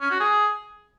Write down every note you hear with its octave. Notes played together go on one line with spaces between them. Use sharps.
C#4
F#4
G#4